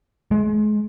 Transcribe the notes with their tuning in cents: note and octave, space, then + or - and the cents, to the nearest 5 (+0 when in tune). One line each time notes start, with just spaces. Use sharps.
G#3 +30